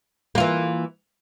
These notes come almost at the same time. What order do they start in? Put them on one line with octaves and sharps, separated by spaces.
A#3 F4 E3